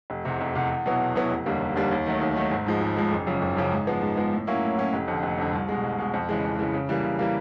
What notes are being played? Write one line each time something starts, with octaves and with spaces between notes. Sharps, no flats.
F1
E2 C3
F1
E2 C3
E2
B2 F#3 B3 E4
E2
B2 F#3 B3 E4
F1
D#2 D3 G3 A#3
F1
D#2 D3 G3 A#3
D#2
D#3 F#3 A3
D#2
D#3 F#3 A3
G#1
G#2 F3 G#3
G#1
G#2 F3 G#3
F#1
F#2 C#3 F3
F#1
F#2 C#3 F3
G#2
F3 G#3 B3
G#2
F3 G#3 B3
A2
F#3 A#3 C#4 E4
A2
F#3 A#3 C#4 E4
F1
F2 D3
F1
F2 D3
C2
B2 G#3
C2
B2 G#3
F2
C#3 E3 G#3
F2
C#3 E3 G#3
C#3
E3 G3 A#3
C#3
E3 G3 A#3